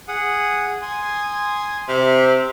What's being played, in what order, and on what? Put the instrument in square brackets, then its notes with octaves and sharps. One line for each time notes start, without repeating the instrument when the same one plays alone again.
[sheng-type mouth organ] G#4 F#5 D#6
G#5 C6 D#6
[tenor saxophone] C3 [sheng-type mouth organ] E5 D6 F6